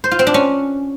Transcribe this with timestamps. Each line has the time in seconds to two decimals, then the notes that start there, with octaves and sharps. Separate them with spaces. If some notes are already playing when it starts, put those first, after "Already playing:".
0.04 C5
0.11 F4
0.19 C4
0.27 D4
0.34 C#4